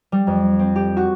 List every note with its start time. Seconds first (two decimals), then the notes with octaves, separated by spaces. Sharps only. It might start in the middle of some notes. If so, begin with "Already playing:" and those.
0.12 G3
0.27 F2
0.59 C4
0.75 G4
0.97 F#4